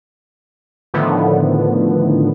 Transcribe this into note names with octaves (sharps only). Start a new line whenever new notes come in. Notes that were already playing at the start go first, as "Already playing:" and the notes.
A2 D3 D#3 F3 A3 B3